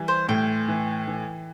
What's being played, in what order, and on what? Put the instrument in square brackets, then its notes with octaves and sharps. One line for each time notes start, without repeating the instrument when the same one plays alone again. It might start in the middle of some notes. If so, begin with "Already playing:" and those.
Already playing: [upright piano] E3 G3
[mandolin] C5
[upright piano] A2 [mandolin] G5
[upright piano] E3
E3